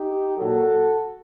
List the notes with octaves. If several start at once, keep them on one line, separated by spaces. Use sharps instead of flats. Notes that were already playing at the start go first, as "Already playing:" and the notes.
Already playing: D#4 G4
A#2 F#3 F#4 A4